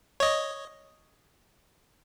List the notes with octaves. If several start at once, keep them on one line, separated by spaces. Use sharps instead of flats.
C#5 D#5